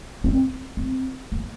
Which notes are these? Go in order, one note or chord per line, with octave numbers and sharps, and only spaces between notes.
C4
C4
A#3